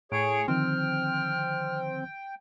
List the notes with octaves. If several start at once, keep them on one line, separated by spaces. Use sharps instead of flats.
A2 G#4 C#5 D7
D3 D#3 F3 C4 G5 F6